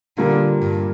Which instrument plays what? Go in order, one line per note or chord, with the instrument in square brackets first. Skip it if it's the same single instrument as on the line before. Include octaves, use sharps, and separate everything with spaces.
[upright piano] A#2 G3 A#3 F4 [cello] D3
[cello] G2